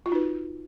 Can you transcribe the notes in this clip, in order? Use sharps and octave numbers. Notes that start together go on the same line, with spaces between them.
D#4 F4 F#4 B4